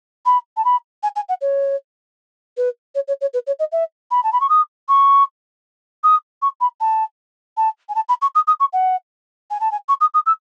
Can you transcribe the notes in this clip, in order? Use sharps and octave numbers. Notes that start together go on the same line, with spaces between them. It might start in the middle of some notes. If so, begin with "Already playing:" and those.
B5
A5
B5
G#5
G#5
F#5
C#5
B4
C#5
C#5
C#5
B4
C#5
D#5
E5
B5
A5
B5
C#6
D#6
C#6
D#6
C#6
B5
A5
A5
G#5
A5
B5
C#6
D#6
D#6
C#6
F#5
G#5
A5
G#5
C#6
D#6
D#6
E6